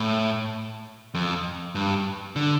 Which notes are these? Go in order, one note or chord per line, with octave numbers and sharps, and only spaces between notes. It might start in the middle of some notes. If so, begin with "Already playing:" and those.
Already playing: A2
F2
G2
D3